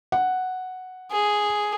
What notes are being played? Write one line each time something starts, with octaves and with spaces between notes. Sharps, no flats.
F#5
G#4